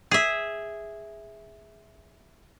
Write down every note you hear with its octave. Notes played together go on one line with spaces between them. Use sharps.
G#4 E5